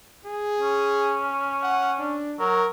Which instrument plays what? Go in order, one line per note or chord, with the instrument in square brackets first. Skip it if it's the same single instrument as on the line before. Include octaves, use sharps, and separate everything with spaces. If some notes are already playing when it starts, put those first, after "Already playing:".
[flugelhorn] G#4
[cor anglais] C#4
[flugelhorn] F#5
D4
[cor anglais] F#3 [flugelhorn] A#4